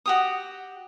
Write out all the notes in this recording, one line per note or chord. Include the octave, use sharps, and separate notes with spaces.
F#4 G4 D#6